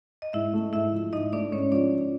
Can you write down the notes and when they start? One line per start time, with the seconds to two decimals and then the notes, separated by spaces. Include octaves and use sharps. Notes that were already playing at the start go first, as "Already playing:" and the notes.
0.22 D#5
0.33 G#2 E4 E5
0.53 A3
0.73 G#2 E4 E5
0.93 F3
1.12 G#2 D#4 D#5
1.33 A3 D4 D5
1.52 G#2 C#4 C#5
1.72 F3 D4 D5